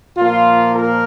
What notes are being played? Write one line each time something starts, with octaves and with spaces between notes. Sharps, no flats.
A#2 F3 A#3 F4
A#4